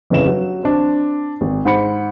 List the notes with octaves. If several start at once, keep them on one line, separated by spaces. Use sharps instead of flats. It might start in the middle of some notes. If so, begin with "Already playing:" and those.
G1 F2 C#3 E4 E7
F#3
C4 D4
G#1
G#2 C5 B5 C#7